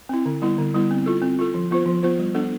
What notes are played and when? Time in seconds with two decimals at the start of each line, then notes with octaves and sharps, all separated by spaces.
0.09 C4 E4
0.25 D3
0.42 G3 B3 E4
0.58 D3
0.74 G3 B3 E4
0.91 C4
1.06 F4 A4
1.22 C4
1.39 F4 A4
1.54 F3
1.71 B3 F4 C5
1.86 F3
2.03 B3 F4 C5
2.19 G3
2.35 B3 D4 A4